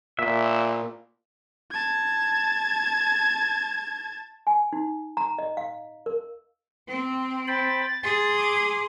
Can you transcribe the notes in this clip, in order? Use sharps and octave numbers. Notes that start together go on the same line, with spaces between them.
A#2 E5
A5 G#6
G#5
D#4
A#5
D#5
F5
A#4
C4
C5 G5 B5 A6
G#4 C6
D6